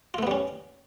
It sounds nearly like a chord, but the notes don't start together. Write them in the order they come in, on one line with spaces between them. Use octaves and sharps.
F4 A3 B3 G3 C#4